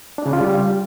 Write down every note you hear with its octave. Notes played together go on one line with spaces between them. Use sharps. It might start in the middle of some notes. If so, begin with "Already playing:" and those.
D4
C#3
F4
G3